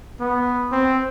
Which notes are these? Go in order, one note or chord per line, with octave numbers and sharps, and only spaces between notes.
B3
C4